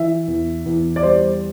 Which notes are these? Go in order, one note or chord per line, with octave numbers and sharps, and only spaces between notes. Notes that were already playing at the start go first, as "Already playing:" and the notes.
Already playing: E3 E5
E2
E2
D5
G3 C5